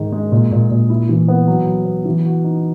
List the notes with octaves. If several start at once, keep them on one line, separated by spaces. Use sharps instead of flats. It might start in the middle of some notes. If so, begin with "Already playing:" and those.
Already playing: G#2 D#3 D#4
G#3
A#2
A#2
A#2
E4
E3
B3
F#3
F#3
B3
E3
F#4
D#4